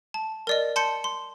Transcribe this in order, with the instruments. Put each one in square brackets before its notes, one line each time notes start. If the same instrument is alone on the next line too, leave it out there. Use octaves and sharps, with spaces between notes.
[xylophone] A5
A#4 D5 D#5
A5 C6 G6 C#7
C6